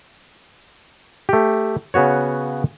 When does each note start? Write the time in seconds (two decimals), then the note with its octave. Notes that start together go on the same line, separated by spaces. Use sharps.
1.29 A3 G4
1.94 C#3 B3 F#4 C#5